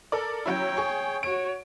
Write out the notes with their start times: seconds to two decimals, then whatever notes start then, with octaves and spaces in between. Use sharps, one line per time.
0.12 A4 A#4 D5
0.46 F#3 C#4 E4 C#5 G5
0.77 G#4 C#6
1.23 F#4 C#5 D7